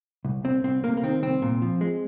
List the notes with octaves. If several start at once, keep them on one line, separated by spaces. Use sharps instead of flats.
C2
C2 C4
C2 C4
C3 A#3
A#3
D#3 C4
C2 C4
A#2
F3
G#3